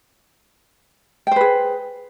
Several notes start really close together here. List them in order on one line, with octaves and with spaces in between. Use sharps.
G5 C5 B4 G#4